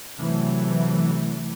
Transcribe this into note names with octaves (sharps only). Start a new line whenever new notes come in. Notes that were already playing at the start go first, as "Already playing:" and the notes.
C3 E3 F#3 A3